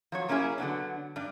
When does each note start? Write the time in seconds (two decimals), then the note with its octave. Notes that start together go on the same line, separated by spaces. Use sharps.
0.12 F3 F#3 C#5
0.28 F#3 A#3 C#4 E4 G#4
0.58 D3 F#3 B3 D4
1.16 G2 D4